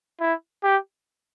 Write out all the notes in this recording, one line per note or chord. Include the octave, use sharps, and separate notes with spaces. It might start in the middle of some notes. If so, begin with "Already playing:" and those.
E4
G4